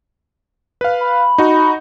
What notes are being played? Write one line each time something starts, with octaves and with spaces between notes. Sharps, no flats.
B4 F5
B5
D#4 F#4